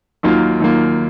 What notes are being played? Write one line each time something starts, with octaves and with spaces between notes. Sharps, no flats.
D#2 D#3 F#3 A#3 F4
D#2 D#3 F#3 A#3 F4